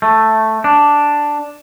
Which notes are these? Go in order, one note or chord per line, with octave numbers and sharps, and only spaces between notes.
A3
D4